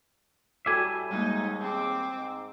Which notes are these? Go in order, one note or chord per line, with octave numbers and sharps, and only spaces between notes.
A2 G3 F#4 A4 E5 G#5 D6
D#2 G#2 G3 G#3 A#3 D#4
C4 G#4 D6
G#2